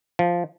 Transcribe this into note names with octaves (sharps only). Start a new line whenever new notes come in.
F3